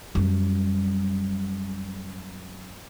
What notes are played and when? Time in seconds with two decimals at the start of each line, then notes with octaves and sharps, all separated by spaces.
0.15 F#2 G3